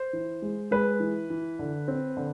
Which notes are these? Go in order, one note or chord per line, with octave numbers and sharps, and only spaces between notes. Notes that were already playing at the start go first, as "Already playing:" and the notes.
Already playing: C5
E3
G#3
G#3 B4
E3
E3
D3
C4
D3